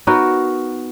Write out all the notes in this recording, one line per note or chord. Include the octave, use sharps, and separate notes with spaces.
B3 D#4 F#4 A#4